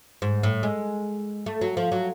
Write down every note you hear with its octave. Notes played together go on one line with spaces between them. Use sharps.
G#2
A2
G#3
A3
F#3
F3
F#3